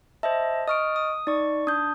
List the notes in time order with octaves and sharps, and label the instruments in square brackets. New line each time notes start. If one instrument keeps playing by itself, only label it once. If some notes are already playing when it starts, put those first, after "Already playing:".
[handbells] C5 D#5 A5 [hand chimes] E5
[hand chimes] D#5 C#6 D7 [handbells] D#6 F6
[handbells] D#6
[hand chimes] D#4 [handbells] D5 C#6
[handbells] D4 [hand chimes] D#6 G6